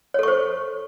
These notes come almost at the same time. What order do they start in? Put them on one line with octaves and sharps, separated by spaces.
C#5 A4 C#6 C5